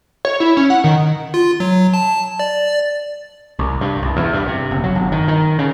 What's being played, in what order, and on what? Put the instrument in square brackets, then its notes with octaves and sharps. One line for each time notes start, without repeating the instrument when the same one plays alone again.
[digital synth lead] C#5
E4
C#4
F#5
D#3
[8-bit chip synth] F4
F#3
A5
D5
[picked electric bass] C2
G2
C2
E2
G2
C3
F#1
F#3
G1
D#3
D#3
C#3